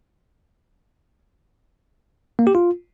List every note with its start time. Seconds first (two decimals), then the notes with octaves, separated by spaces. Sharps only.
2.39 A#3
2.47 G4
2.55 F4